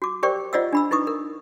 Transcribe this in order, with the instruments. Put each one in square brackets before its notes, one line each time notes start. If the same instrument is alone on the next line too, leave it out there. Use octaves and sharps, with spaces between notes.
[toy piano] F#4 D6
G4 A#4 C5 D5 G5 C#6
F4 C5 D5 D#5 F#5 E6
D4 B5 E6
D#4 E4 B4 C#6 D#6
A#4